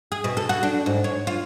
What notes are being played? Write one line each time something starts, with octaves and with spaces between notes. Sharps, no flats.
G#4
B2
A4
F#4
D4
G#2
C#5
F4